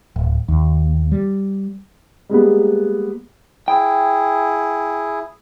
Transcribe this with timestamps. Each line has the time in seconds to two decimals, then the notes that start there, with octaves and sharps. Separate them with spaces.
0.16 D1
0.48 D#2
1.12 G3
2.29 G3 G#3 A#3 B3
3.68 E4 G#4 G5